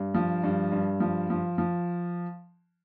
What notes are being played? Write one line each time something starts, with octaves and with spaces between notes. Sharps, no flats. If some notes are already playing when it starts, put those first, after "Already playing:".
Already playing: G2
F3
G2
G2
F3
F3
F3